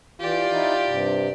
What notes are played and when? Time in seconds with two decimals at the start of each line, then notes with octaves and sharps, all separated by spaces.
0.20 E3 F4 G4 D5
0.50 D#4 E4
0.86 G2 C3